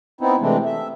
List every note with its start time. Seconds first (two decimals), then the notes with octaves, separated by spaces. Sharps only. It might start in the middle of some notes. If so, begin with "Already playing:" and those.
0.21 B3 C4 D#4 E4
0.41 C3 E3 G#3 A3 C4 D4
0.65 E5